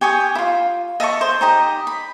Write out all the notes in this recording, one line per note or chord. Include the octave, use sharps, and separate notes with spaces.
G4 G#5 C#6 D#6
E4 F4
D#5 E5 A5 C#6
C5
D#4 G4 D#5
B5